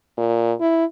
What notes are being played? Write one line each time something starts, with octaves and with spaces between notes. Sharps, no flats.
A#2
E4